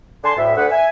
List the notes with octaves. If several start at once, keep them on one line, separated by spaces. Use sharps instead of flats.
D3 G#5 A5 C6
D2 A2 E5
D2 B4 F#5
E5 G#5